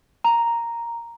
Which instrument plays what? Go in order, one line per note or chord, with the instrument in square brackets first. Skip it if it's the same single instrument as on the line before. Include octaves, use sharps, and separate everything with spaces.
[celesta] A#5